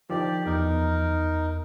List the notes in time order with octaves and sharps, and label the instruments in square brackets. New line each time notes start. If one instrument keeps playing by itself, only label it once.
[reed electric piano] D#3 F3 [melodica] G4 D5
[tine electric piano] E2 [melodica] D#4 A#4